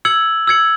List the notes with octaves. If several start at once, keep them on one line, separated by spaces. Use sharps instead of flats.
E6 G#6 C#7 F#7
E6 G#6 C#7 F#7